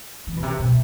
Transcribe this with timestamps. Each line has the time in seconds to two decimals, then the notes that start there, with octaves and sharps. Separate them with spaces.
0.27 E3
0.37 B2
0.43 C3
0.59 B2